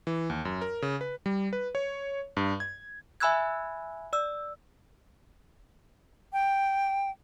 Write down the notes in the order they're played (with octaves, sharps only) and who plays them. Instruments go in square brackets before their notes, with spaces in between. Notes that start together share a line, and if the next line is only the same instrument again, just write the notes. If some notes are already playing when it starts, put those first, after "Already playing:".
[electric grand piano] E3
D#2
F#2
A#4
C#3
B4
G3
B4
C#5
G2
G#6
[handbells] E5 G#5 B5 E6 F#6 G#6
D5 E6
[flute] G5